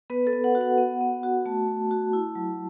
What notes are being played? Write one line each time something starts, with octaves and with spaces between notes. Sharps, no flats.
B3 B4
A4
B3
F#5
F#4
F#5
B3
B3
F#4
A3 A5
A3
F#4
E4
F#3